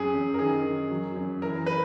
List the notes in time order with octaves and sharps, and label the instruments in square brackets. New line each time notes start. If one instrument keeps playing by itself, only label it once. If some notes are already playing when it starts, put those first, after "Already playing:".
Already playing: [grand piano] F#2 G#4
F#2
A#4
D#3 G#4
D#3
F#3
F#2
E3 A#4
B4